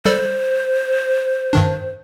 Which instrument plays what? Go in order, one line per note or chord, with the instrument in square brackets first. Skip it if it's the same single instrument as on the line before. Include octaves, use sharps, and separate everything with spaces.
[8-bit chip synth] G3 A4 D5 [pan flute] C5
[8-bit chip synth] G2 D#3 D4